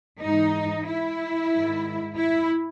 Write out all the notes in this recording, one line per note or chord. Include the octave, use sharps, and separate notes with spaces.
G#2 E3 D#4
E4
G#2 D#3
E4